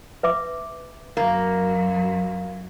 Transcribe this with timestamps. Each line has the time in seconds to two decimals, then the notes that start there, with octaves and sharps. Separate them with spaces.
0.23 B4 E5 D6
1.17 F#2 F#3 A#3